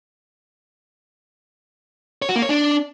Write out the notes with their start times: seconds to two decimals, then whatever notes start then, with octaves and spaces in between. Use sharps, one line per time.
2.22 C#5
2.29 F#4
2.36 A#3
2.42 C#5
2.49 D4